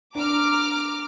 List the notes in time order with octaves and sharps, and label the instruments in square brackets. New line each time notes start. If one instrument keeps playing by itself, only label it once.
[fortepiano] D4 [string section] A#5 D6 F6